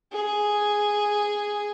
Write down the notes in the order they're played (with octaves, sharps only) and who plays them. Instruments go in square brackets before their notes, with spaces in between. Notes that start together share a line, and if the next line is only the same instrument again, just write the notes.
[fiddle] G#4